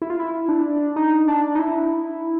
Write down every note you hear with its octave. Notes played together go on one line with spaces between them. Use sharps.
E4
F4
E4
D4
D#4
D4
D#4
E4